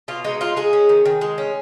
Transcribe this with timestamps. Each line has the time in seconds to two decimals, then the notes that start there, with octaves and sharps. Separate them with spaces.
0.08 B2 F4
0.24 G#3 D#4
0.41 D#4 F4
0.57 G#3 G#4
0.73 C#4
0.89 D#3
1.05 D#3
1.21 G#3
1.38 C#4